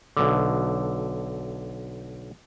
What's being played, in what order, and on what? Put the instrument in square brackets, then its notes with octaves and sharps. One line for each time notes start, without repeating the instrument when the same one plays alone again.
[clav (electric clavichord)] B1 D3